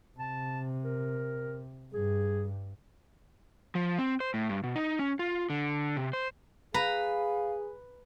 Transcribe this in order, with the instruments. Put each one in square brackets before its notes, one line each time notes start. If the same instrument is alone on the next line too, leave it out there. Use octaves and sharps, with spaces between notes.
[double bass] C3 [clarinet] A5
[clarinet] A#4
[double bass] G2 [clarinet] G#4
[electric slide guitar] F3
C4
C5
A2
G2
B2
D#4
C#4
F4
D3
C3
C5
[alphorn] G#4 [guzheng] B4 A#5 [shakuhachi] F5